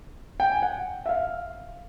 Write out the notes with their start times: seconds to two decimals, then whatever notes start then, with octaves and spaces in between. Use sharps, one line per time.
0.40 G5
0.52 G#5
0.62 F#5
1.06 E5
1.09 F5